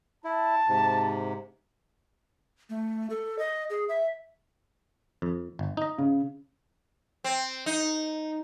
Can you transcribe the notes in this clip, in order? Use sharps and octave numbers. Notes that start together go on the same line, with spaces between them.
E4 A5
G#2 C3
A3
A4
D#5
G#4
E5
F2
G1
D#4 D#5
C#3
C4
D#4